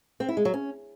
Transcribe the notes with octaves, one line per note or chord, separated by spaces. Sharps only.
C4
E4
G#3
F#3
C#4